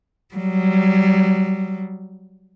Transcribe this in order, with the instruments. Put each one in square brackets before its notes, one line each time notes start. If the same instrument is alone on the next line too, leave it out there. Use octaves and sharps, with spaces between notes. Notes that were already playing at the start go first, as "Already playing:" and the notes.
[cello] F#3 G3